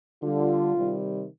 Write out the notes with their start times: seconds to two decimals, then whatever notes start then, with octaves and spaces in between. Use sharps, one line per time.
0.22 D3 G3 F4
0.75 C3 D#3 G3